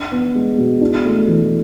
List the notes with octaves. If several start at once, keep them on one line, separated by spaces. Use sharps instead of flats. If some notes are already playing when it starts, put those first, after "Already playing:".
Already playing: D4
B3
G#3
B2
D4
A3
E3